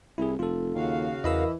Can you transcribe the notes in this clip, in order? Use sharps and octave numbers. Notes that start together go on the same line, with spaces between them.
C2 E4 G#4
F1 F4 A4
D#2 C#3 F#4 F5
E2 E3 A#4 D#5 B5 E6